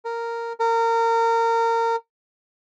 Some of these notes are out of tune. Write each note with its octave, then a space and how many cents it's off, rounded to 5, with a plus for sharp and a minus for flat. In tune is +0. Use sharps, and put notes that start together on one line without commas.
A#4 -10
A#4 -25